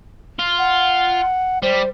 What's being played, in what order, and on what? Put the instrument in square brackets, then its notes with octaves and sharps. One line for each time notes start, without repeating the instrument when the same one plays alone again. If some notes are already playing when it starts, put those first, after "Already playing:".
[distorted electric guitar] F4
[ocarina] F#5
[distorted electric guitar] G3 [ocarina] C5